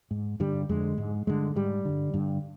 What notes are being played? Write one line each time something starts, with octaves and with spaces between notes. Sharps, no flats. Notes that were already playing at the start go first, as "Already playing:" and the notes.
G#2
G2 D3 G3
F2 D3 G#3
G#2
G2 D3 G#3
G#2 G3
G2 D3
G2 D3